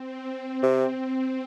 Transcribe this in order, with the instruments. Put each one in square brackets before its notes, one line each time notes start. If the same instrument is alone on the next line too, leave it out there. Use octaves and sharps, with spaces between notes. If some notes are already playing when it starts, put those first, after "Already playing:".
Already playing: [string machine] C4
[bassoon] C3